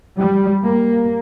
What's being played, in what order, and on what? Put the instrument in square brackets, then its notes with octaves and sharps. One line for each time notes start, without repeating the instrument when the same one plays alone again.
[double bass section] G3
A#3